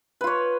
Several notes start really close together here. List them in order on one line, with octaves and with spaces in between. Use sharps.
B4 F4 C#5